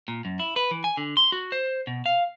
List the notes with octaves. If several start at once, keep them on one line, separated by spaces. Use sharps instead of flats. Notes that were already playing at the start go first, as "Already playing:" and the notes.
A#2
F#2
E4
B4
E3
G#5
D3
C6
F#4
C5
B2
F5